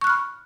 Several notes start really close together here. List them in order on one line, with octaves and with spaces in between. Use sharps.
C#6 F#6 F6 B5